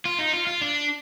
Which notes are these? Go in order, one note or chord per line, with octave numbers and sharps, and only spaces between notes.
F4
D#4
F4
F4
D4